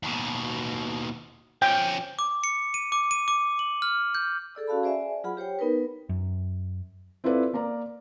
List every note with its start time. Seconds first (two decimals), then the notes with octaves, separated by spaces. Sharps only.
0.03 D#2 B2
1.62 F3 C#4 G5
2.19 D6
2.44 C#7
2.74 D#7
2.92 D6
3.11 D#7
3.28 D6
3.59 F#7
3.82 F6
4.15 G6
4.55 G#4 A4 D5 E6
4.67 C#4 F#4 F5 A5 B5
4.83 G#4 C5 D5 E5 G#5
5.24 F#3 F4 G#4 F#5 B5
5.37 G4 C5 C#5 G5
5.59 B3 D#4 A#4 B4
6.09 F#2
7.24 C4 E4 F4 A4 B4 D5
7.53 A#3 A#4 D5 A#5